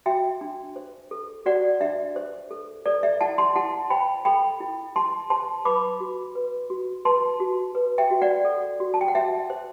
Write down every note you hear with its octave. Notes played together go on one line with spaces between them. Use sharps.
F#4 E5 G5
D4
C5
A4
F#4 D5 F#5
D4 E5
C5
A4
A4 D5
E5
E4 F#5 A5
A5 C6
E4 F#5 A5
C5 G5 B5
A4 G5 B5
E4
E4 A5 C6
C5 A5 C6
B4 B5 D6
F#4
B4
F#4
B4 A5 C6
F#4
B4
E5 G5
F#4
D5 F#5
A4
F#4
A5
G5
F#5
F#4 E5
C5